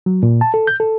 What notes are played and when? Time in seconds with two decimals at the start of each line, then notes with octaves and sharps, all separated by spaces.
0.06 F#3
0.23 A#2
0.41 A5
0.54 A4
0.67 G6
0.80 A4